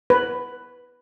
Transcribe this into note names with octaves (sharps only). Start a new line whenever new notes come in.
B4